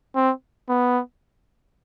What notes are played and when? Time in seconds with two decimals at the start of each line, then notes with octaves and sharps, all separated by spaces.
0.16 C4
0.69 B3